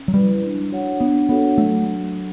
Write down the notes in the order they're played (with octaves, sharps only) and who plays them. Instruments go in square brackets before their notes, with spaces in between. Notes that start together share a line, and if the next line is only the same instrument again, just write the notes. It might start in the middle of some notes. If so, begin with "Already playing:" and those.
Already playing: [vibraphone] C#4
[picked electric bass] F#3
[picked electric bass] G3 [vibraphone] E4 B4
[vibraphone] D4
F#4 C#5 F#5
[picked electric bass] B3 [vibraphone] D4
[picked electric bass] B3 [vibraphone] F#4 A4 C#5 F#5
[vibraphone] F#3 [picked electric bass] A3